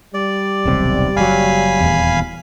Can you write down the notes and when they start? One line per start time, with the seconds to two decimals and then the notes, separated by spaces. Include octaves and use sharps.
0.14 G3 D5
0.65 D#1 B1 C3
1.16 F#1 F#3 F5 G#5 B5
1.80 D#1 E2